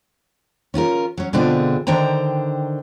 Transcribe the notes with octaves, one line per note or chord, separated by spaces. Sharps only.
C#4 F4 F#4 A#4
F#3 C#4
B2 D3 C4 D4 F4 G#4
D3 D#3 D4 C5 G5 A#5